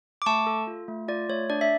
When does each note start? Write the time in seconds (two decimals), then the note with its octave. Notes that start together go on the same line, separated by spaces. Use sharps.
0.22 D6
0.26 A3 A5 C#6
0.47 A4
0.67 F4
0.88 A3
1.08 F4 D5
1.29 A3 C#5
1.50 D4 D5
1.61 E5